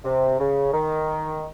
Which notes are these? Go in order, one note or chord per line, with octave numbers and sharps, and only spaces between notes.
C3
C#3
D#3